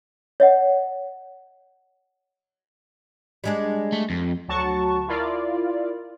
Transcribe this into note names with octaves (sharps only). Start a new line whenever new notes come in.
C#5 D#5 F#5
G3 G#3 D4
A3
F2
D2 F#3 F#4 A5 C#6
E4 F4 A#4 D5